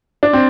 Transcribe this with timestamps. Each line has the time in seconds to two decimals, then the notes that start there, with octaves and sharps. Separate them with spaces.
0.23 D4
0.33 C4